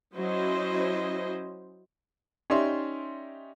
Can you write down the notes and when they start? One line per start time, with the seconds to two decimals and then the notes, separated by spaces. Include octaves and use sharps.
0.16 F#3 C#4 E4 C5 D#5
2.50 C#4 D#4 G4 D5 E5 C6